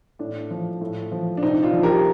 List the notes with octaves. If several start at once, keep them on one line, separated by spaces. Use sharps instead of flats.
A2 D4
F3
A2
F3
D4
C3 C4 D#4
D4 F4
F3
G4 A#4